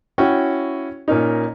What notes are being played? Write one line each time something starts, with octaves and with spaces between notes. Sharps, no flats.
C#4 E4 F#4 G5
A#2 A#3 C#4 D#4